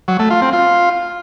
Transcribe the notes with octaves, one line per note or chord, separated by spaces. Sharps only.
F#3
A3
F4
C4
F4